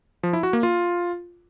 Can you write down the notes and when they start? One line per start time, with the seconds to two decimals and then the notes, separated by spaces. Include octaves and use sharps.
0.23 F3
0.33 E4
0.43 F#4
0.53 A#3
0.63 F4